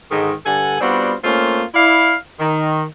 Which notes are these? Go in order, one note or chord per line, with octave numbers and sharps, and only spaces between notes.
G#2 D3 D#3
G2 D3 A4 F#5 G#5
G3 B3 C4 D4 F4 F#4
A3 A#3 C4 C#4 F4
E4 D5 F5
D#3